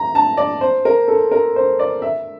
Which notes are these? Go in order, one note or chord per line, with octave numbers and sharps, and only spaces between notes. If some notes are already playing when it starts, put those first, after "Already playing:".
Already playing: A#5
A5
D5
C5
A#4
A4
A#4
C5
D5
E5